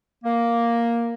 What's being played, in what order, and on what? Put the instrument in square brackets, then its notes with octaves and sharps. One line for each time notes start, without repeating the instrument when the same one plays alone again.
[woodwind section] A#3